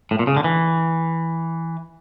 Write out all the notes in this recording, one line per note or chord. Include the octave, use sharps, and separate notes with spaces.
A2
A#2
C#3
D3
E3